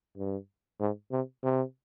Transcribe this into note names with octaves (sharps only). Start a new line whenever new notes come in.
G2
G#2
C3
C3